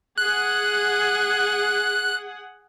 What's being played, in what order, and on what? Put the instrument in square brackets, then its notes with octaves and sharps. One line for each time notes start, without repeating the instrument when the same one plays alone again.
[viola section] G#4 F#5 [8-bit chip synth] F#6